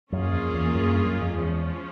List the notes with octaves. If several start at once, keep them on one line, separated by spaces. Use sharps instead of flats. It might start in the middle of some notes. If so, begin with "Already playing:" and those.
F#2 A#3 C#4 F4 G#4
F2
E2
F#2
G2
F#2
F2
E2 F3 G#3 C#4